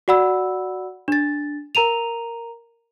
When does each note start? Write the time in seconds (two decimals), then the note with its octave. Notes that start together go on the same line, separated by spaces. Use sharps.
0.08 F#4 D5 F#5 B5 E6
1.08 D4 A6
1.75 A#4 A#5 D#7 F7